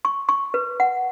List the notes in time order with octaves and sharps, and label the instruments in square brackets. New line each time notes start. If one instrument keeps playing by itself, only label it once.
[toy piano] C#6
C#6
B4
F#5